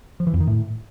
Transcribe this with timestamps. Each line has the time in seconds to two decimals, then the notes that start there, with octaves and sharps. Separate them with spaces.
0.20 F3
0.27 E3
0.34 F2
0.40 D#3
0.47 A2